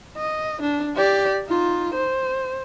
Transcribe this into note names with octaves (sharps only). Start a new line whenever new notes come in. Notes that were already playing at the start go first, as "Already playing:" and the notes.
D#5
D4
G4 D5
D#4 F4
C5